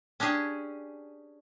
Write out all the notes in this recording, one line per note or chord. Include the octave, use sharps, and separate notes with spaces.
C#4 D4 G4 G#4 G#5